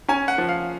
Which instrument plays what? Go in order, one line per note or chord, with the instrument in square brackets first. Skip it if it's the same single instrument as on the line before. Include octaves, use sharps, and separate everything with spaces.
[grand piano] C#4 G#5
F#5
F3
F5